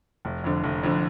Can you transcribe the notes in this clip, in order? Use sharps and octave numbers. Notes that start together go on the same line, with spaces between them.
F1
F2 D3
F1
F2 D3